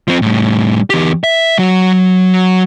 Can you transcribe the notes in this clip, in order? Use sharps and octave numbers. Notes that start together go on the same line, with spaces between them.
F3 C4
A2 G3
E2 G4
E5
F#3 F#4